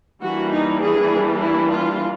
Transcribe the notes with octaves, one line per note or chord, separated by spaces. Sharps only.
E3 G3 A#3 D4 F#4
D#4
G#4
E4
F4